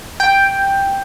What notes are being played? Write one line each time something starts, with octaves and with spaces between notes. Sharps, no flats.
G5